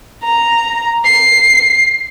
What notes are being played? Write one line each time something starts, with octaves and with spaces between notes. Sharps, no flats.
A#5
C7